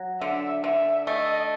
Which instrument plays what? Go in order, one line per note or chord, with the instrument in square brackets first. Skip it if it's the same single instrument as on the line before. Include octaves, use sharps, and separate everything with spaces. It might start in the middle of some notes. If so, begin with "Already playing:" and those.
Already playing: [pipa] F#3
[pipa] D3 [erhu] E5
[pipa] D3 [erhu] E5
[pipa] A3 [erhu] D#5